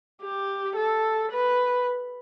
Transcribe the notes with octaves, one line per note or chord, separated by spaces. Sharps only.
G4
A4
B4